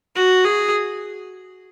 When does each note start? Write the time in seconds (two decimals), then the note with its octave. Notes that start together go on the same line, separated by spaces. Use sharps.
0.16 F#4
0.45 G#4